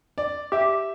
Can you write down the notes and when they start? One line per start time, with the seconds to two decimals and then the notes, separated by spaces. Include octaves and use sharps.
0.18 D5
0.52 G4 E5